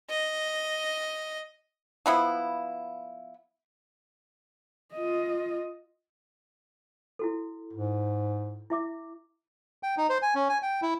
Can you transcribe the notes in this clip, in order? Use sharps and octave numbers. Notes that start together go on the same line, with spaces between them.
D#5
F3 B3 E4
F4 D#5
E4 F#4 A4
G#2
E4 E5 D6
G5
D#4
C5
G#5
C#4
G#5
G5
E4